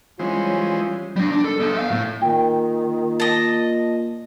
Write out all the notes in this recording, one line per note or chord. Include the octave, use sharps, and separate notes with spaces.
E3 G3 G#3 C#4 F4 C5
G3 D4
D4
A4
B3 A4
E5 F5
A2
A#2 D#3 G5
D#5 A5